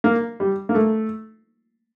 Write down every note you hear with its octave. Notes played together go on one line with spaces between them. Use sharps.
A#3
G3
A#3
A3